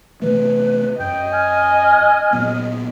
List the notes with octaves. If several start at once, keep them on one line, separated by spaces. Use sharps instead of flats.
C3 E3 A3 B4
F#2 D#5 G5
G#5 F6
A#2 F#3 B3